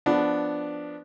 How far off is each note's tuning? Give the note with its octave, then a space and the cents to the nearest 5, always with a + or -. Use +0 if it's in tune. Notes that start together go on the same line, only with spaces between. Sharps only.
F3 +0 B3 +0 D4 +0